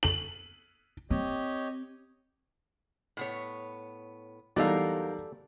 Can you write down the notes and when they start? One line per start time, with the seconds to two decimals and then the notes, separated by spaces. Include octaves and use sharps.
0.03 F#7
1.10 C4 G4 C#5 D#5
3.17 A2 B3 C#5
4.56 E2 F#3 G3 D#4 A4 A#4 D5 F5